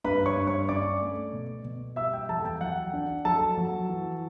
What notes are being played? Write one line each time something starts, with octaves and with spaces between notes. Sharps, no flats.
G2 B4 B5
C#5 C#6
G2
C#5 C#6
C#4 D5 D6
A3
B2
B2
G3 E5 E6
G5
E2 A4 A5
G5
F#3 F#5
D4
F#3 A4 A5
F#3
E3